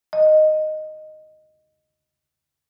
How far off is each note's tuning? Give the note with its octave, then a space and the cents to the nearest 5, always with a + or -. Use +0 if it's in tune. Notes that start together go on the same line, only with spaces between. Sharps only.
D#5 -5